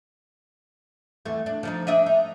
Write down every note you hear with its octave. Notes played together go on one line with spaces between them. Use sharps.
E2 A3
D4
F3 D4 D#4
D4 D#5 E5
D#4